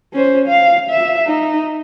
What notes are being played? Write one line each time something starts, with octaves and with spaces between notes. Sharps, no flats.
C#4 C5
F5
E5
D#4